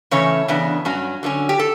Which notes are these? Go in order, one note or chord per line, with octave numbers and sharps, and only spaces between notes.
C#3 E3 A3 C#4 C#5
C#3 E3 B3 D4
G2 F#3 C#4
D3 F#3 A3 C#4
G4
A4